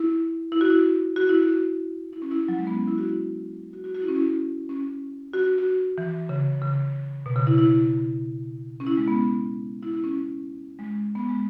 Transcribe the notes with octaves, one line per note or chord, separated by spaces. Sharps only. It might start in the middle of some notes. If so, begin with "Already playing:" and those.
Already playing: E4
E4
F#4
E4
F#4
E4
F#4
E4
C#4
E4
F#3
G#3
B3
C#4
E4
F#4
E4
F#4
F#4
F#4
E4
C#4
E4
C#4
F#4
F#4
E3
C#3
C#3
B2
C#3
E4
E4
C#4
E4
G#3
B3
E4
E4
C#4
G#3
B3
G#3